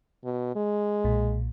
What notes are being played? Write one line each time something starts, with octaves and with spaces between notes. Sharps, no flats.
B2
G#3
B1 A#2